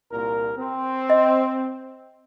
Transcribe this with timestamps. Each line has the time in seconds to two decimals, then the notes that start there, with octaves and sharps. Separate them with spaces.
0.12 C2 A#2 A#4
0.57 C4
1.10 D#5